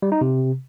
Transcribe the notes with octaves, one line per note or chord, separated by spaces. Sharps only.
G3
D#4
C3